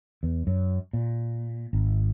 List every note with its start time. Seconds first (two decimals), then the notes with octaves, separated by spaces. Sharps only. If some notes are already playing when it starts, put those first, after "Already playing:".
0.23 E2
0.47 F#2
0.93 A#2
1.73 G#1